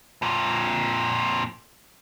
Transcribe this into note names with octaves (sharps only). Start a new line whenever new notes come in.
F2 A#2